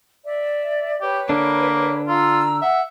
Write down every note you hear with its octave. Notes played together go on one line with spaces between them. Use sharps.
D5 E5
G4 B4 C#5
D3 A#3 D4
F4 A#5 E6
E5 F#5